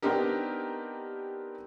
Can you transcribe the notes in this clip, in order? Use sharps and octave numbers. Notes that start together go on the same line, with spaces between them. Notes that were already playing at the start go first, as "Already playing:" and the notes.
B3 C4 D4 D#4 G4 A#4